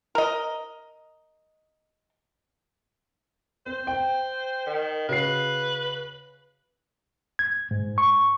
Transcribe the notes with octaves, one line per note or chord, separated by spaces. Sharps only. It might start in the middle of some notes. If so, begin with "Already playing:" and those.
A#4 D#5
C4 C5
G5
D#3
C#3 F#4 B4 C7
G#6
G#2
C#6